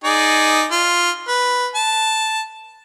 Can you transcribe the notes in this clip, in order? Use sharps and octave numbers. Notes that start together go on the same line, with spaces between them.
D#4 G#4 D5
F4
B4
A5